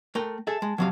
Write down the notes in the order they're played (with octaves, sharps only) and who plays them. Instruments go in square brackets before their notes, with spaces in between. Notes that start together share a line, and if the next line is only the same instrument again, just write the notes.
[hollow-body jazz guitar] A3 A#4 G5
[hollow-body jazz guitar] G#4 A4 E5 [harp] A5
[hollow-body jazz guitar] G#3
[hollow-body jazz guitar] F2 C3 F5 [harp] F#3